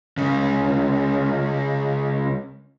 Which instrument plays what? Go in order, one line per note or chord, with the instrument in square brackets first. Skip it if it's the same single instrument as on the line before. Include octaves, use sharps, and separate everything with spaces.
[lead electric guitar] C#2 C#3